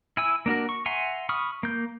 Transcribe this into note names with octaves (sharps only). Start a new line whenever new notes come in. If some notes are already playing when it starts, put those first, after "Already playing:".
E4 G#5 E6
A#3 D4 F#4 A#4
C#6
E5 F#5 G#5 A#5 C6
B5 C#6 D#6 F6
A#3 G6